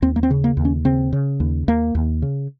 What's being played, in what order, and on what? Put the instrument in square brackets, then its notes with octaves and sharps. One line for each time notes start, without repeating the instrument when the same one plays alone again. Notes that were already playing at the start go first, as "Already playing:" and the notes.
[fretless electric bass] D#2 C4
A#3
C4
C#3
A#3
D#2
C#4
C#3 C4
C#3
D#2
D#2 A#3
D#2
C#3